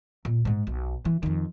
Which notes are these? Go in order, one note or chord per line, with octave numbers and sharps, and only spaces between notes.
A#2
G#2 G#3
B1
E3
F2 D#3